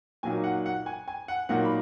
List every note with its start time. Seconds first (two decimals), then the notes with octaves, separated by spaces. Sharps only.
0.23 A#2 F#3 A#3 D#4 G#5
0.44 F#5
0.66 F#5
0.86 G#5
1.08 G#5
1.28 F#5
1.49 A#2 F#3 A#3 D#4 F#5
1.65 B5